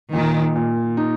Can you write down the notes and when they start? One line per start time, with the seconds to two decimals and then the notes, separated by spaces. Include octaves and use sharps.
0.13 A#2 D#3
0.55 A#2
0.97 D#4